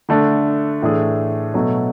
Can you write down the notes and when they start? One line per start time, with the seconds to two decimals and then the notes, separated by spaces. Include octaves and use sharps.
0.09 D3 A3 D4
0.82 A2 E3 A3 D4 G#4
1.54 B2 F#3 A3